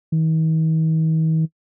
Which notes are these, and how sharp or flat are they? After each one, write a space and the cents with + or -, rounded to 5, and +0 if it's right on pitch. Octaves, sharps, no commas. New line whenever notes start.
D#3 +45